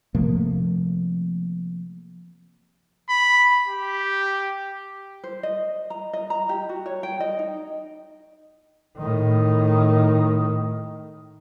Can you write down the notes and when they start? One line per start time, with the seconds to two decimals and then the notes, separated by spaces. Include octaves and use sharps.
0.15 C3 F3 A3 A#3
3.10 B5
3.67 G4
5.24 C5
5.43 D#5
5.90 A#5
6.13 D#5
6.30 A#5
6.49 G4
6.69 F#4
6.86 C#5
7.03 G5
7.20 D#5
7.39 D#4
8.98 A2 D#3